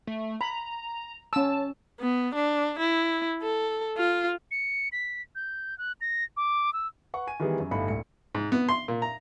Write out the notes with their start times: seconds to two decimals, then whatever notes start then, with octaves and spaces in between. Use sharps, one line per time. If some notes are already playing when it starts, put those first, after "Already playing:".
0.07 A3
0.41 A#5 B5
1.33 C#4 A5 E6
2.00 B3
2.34 D4
2.79 E4
3.42 A4
3.97 F4
4.51 C#7
4.92 B6
5.35 G6
5.78 F#6
6.01 A#6
6.37 D6
6.73 E6
7.14 B4 F#5 C#6
7.27 G#5 D#7
7.40 D#3 E3 G3 B3 G#4
7.60 F#2
7.71 G1 A2 D#4 F5 B5 C#7
7.88 D1 C#7
8.35 G#2
8.52 B3
8.69 C6
8.88 A#2
9.02 A#5